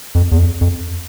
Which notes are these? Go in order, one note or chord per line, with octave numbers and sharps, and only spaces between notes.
F2
E2
F2
F2